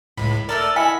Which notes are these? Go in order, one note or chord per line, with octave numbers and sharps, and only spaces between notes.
C#2 A2 B5
A3 B3 A4 A#4 D5
E4 D#5 F#5 G#5 B6